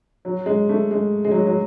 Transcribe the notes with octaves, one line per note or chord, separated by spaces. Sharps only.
F#3
G#3
A3
G#3
G#3
F#3
F#3